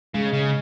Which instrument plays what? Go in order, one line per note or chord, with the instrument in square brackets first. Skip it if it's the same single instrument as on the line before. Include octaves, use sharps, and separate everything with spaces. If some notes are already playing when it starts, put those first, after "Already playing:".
[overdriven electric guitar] C#3 [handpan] G#3
[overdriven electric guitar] C#3